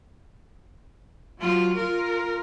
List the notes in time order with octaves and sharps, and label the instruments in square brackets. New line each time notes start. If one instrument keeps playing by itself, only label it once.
[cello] F#3 F4
F4 A#4